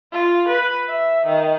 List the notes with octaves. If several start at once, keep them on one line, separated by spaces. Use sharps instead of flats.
F4
B4
E5
D#3